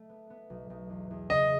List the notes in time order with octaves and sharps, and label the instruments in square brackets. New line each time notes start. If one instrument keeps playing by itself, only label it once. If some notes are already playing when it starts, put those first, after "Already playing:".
Already playing: [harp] A3
B3
B3
B1
B1
E2
E2
[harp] C#3 [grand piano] D#5